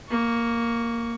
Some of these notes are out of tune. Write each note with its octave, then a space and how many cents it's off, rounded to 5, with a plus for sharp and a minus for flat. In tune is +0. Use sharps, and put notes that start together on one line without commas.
A#3 +0 C#6 +15